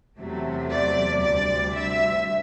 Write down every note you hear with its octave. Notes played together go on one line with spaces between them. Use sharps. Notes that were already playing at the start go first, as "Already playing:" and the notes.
E2 C3 F#3 A3
D5
D2 C3 G3 D5
E5